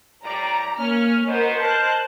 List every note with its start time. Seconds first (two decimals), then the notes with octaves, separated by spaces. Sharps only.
0.24 A2 G3 D5 A#5
0.79 A#3 C#4 F6
1.27 B3 F#4 A#4 C5 D#5
1.58 A#4 C5 A5 F#6